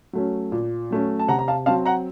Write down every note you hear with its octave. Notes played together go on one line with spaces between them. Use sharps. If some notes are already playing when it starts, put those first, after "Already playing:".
F#3 A3 C#4
A#2
F#3 A3 C#4
A5
C3 F#5 A#5
A#5
F5 A5
F#3 C4 F5 A5
F#5 A#5